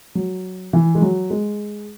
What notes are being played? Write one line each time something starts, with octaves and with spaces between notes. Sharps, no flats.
F#3
E3
G#3
F#3
G#3